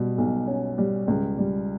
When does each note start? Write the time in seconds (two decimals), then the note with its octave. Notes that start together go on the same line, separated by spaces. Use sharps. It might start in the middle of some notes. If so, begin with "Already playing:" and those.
Already playing: B2 G3
0.18 B1
0.47 C#4
0.78 G3
1.08 C#2
1.38 G3